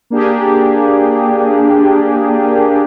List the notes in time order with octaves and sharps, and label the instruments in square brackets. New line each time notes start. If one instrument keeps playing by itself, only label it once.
[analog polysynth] A#3 D4 G4 G#4